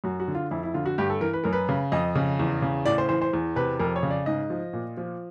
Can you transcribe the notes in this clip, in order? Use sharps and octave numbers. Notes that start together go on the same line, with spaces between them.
F#2 F#4
F#4
D3
F4
F2 E4
E4
D3 F4
F#4
G2 G4
A4
E3 A#4
B4
F#2 A#4
B4
C#3
F2 D#5
C#3
E2
C#3
A2 D5
C5
E3 C5
C5
E2
C3 B4
F2 A#4
C#5
C#3
D5
G#2 D#5
F3
A#2
F3